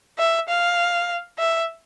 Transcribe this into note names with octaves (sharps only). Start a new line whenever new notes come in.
E5
F5
E5